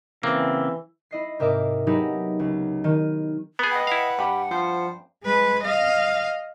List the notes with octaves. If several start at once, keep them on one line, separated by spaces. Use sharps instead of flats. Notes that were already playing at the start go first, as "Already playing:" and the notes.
C#3 E3 A#3 C4 E5
E4 D#5 C7
G#2 C3 A#4 D#5 E5 D6
F#3 B3 D#4 E4 G4 G#4
C#2
D#3 D#7
B3 G#4 B4
D#5 F#5 G5
E4 F5 F#5
G2 G4 B5
F3 C5
G#3 B4
D#5 F5